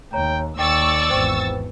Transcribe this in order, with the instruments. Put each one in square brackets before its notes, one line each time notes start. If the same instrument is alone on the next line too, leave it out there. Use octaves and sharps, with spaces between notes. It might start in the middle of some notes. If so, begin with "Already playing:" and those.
[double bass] D#2 [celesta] C#5 A#5 [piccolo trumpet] G5
[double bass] D#2 [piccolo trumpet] D5 [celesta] G5 [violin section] C#6 E6 A6
[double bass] G#1 E2 [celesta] C5 G5